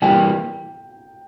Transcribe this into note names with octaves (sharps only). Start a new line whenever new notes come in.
E3 G3 A#3 G5